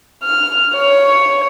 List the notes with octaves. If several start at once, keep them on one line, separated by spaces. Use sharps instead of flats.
F6
C#5